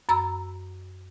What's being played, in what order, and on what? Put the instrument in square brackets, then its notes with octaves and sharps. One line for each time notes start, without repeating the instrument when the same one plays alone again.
[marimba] F#2 A#5 B5 E6